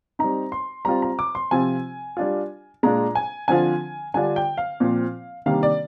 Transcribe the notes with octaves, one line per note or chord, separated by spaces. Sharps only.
G3 C4 D#4 A#5
C6
G3 C4 F4 A#5
A#5
D6
C6
C3 F3 C4 F4 G#5
G3 D4 F4
A#2 G#3 D4 F4 A#5
G#5
D3 F3 C4 F4 G#5
D3 G3 D4 F4 G#5
G5
F5
A#2 F3 C4 F4
C3 D#3 G3 A#3 D4 F5
D5